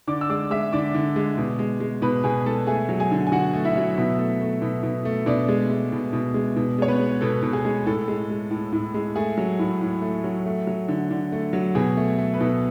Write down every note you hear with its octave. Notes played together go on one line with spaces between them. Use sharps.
D3 D5 D6
E6
G#3 D5 D6
G#3 E5 E6
D3 D5 D6
D3
G#3
B2
G#3
G#3
B2 B4 B5
B2 G#4 G#5
G#3 A4 A5
A3 G#4 G#5
F#3
G#4 G#5
D3
G#5
D3 F#4 F#5
A3
E4 E5
F#3
B2
A3
A3
B2
B2
A3
B2 D4 D5
G#3
G#3
B2
B2
G#3
B2
G#3 C#5
B3 B4
G#3
B2 A4
B2
G#4
G#3
A2 A4
G#3
G#3
A2
A2
G#3
A3 G#4
F#3
A2
A2
A3
F#3
A3
F#3
D3
D3
A3
F#3
B2 G#4
A3
A3
B4
B2 A4